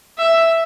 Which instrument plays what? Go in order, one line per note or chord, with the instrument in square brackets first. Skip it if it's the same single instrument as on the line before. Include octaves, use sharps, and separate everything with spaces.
[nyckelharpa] E5